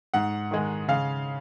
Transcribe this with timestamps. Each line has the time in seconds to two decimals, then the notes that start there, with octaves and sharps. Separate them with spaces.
0.14 G#2 F#5
0.51 D#3 G#3
0.88 C#3 F5